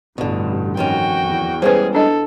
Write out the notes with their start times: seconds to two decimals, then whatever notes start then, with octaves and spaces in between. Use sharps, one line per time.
0.18 A1 G2 B2 D3
0.77 F2 D#3 C#4 F#4 G5
1.25 E2
1.62 G3 G#3 C#4 G#4 B4 C5
1.95 D4 A4 D#5